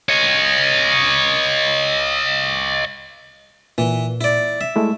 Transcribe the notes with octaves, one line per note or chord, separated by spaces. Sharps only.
C#5 D#5
A#2 E3
E4 D5
E5
G#3 A3 E4